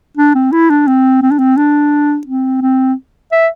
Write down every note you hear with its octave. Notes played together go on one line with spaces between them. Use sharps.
D4
C4
E4
D4
C4
C4
D4
C4
D4
C4
C4
E5